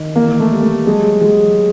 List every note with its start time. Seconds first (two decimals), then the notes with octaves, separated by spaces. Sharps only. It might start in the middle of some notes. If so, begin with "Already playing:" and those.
Already playing: D#3
0.15 E3 A#3
0.40 A3
0.51 G3
0.63 A3
0.86 F#3 G#3
1.21 F#3 G#3